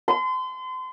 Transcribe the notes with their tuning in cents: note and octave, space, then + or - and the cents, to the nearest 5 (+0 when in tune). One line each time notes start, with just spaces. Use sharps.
C6 -35